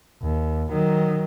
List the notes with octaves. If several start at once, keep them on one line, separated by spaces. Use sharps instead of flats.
D#2
D#3 F#3